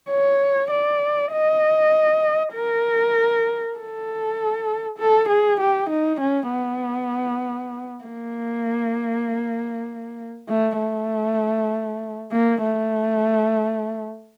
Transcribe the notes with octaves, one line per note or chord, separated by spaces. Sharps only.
C#5
D5
D#5
A#4
A4
A4
G#4
G4
D#4
C#4
B3
A#3
A3
A3
A#3
A3